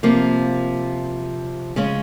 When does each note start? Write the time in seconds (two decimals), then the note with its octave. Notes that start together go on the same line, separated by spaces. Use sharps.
0.03 C3 F3 A#3
1.76 C#3 G#3 C#4